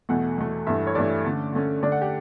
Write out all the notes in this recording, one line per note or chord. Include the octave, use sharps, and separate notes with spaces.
E2 B2 A3 F#5
E2 B2 A3
G2 E3 A3 E5
C#5
G2 E3 A3 D5
D3 A3 C#4
D3 A3 C#4
D3 A3 D4 D5
F#5
G4